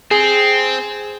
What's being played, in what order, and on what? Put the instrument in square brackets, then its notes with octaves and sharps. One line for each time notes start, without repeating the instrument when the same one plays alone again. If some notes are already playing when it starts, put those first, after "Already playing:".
[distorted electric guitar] C4 [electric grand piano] G#4